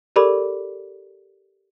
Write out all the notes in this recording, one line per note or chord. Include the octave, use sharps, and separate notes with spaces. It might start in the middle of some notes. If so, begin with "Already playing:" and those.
G4 A4 A#4 D5 B5 D6